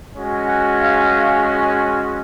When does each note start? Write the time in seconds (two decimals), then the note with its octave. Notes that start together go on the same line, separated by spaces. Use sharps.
0.14 G#3 C#4 F#4
0.47 F#5
0.80 F5